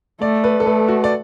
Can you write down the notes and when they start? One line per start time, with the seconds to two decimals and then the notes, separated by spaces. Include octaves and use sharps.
0.21 A3 D5
0.44 B4
0.60 A4
0.66 A3 B4
0.88 F#4
1.04 D5